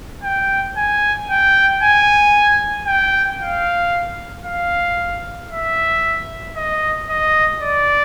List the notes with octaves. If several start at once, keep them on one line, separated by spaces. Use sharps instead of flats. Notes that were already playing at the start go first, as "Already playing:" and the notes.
G5
G#5
G5
G#5
G5
F5
F5
E5
D#5
D#5
D5